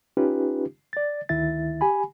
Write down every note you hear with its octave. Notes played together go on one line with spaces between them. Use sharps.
C#4 D#4 F4 G4 B4
D5 A6
D2 D#3 E4 E5 A6
G4 G#5 B5